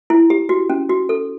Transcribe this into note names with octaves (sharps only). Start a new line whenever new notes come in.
E4
G4
F#4
C#4
F#4
A4